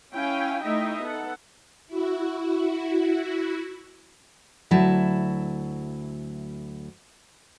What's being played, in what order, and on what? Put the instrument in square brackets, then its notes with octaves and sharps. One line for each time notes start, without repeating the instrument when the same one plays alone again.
[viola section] C#4 E4 F5 G5 G#5
A3 D#4 E4 D#5 E5 G5
B3 A4 F#5
[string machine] E4 F#4
[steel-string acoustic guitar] D2 F#3 E4 A5